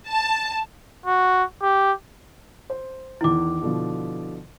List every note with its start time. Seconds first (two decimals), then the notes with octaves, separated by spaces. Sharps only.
0.12 A5
1.06 F#4
1.62 G4
2.70 C5
3.21 E2 D#3 E4 D6
3.61 B2 D3 F3